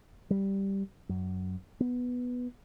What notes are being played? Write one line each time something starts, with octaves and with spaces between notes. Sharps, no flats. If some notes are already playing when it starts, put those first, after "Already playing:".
G3
F#2
B3